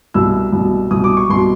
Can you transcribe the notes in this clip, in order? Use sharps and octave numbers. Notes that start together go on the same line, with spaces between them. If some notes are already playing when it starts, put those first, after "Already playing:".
C2 B2 E6
C2 B2
C2 B2 D#6
D6
C#6
C2 B2 C6